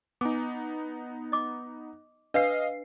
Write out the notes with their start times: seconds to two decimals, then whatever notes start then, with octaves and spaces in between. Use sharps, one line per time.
0.21 B3 D#4 G#5 D6
1.32 D#5 D6
2.34 D4 B4 D#5 F5 C7